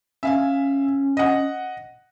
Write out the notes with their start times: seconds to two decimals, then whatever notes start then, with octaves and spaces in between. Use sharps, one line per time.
0.23 C#4 E5 F5 G#5
1.17 D#5 F#5